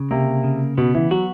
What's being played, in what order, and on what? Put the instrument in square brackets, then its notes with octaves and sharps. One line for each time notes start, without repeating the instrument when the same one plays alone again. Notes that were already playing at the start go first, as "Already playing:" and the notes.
Already playing: [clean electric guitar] C#3
[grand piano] C3 [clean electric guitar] A#3
[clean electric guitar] C#3
[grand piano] B2 [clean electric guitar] B3
[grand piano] E3
[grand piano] F#3 [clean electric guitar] F#4